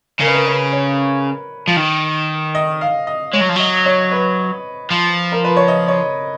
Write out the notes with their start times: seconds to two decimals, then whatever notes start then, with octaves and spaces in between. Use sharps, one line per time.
0.20 C#3 A#4
0.27 B4
0.34 A#4
0.46 B4
0.73 C#5
1.68 F3
1.77 D#3
2.55 D#5
2.81 F5
3.07 D#5
3.33 G#3 C#5
3.41 F#3
3.49 F3
3.56 F#3 D#5
3.86 C#5
4.11 B4
4.90 F3
5.32 A#4
5.44 B4
5.57 C#5
5.68 D#5
5.88 C#5